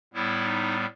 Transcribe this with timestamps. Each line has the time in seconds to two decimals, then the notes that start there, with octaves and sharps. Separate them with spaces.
0.13 A2 G3 B3 E4
0.44 D#4